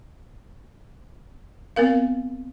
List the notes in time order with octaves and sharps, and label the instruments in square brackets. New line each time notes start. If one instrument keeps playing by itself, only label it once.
[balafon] B3 C4 A#4 F5